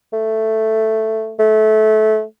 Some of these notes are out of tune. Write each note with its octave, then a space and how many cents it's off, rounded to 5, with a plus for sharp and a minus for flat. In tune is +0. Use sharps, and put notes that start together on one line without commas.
A3 +5
A3 -20